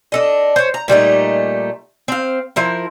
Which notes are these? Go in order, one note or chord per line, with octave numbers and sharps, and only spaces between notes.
D4 A4 D#5
C5 C#5
A#5
A#2 G3 A3 D#4
C4 F5
F3 E4 A#4